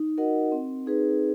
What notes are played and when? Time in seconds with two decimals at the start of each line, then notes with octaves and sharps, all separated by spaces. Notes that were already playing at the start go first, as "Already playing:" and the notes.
Already playing: D#4
0.18 F#4 A#4 D#5 F#5
0.52 C4
0.86 D#4 G#4 B4